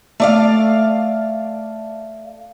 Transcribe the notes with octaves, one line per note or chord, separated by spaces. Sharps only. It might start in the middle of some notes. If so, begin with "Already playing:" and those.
A3 D5 F5